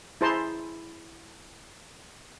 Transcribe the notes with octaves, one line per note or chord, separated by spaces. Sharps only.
E4 G#4 C5 A5 A#5 C6